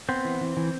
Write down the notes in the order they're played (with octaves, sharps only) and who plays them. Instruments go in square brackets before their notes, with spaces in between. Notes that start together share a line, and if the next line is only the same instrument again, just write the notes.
[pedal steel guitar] B3 C4 C5
E3
E3
E3